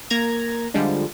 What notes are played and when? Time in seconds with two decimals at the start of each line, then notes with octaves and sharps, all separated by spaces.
0.10 A#3 A#5 G#6
0.74 D3 F3 G3 G#3 D4